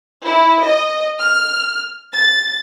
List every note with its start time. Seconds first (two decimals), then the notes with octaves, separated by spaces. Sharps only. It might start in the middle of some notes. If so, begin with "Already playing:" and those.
0.24 E4
0.62 D#5
1.18 F6
2.12 A6